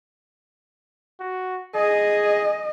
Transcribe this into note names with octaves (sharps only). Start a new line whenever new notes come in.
F#4
G#4 D#5